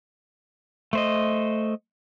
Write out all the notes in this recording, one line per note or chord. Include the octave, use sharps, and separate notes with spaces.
A3 C5 D#5